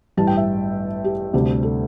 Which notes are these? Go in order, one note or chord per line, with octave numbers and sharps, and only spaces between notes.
A1 G2 G3 A5
G5
E5
G4
D2 C3 G3 D4
A4